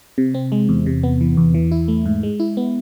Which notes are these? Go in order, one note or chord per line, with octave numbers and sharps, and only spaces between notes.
C3
C4
G#3
E2
C3
B3
E3
E2
E3
E4
A3
G#2
G#3
E4
B3